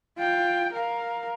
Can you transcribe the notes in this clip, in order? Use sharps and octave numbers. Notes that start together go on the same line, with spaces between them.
F4 G5
A#4 F5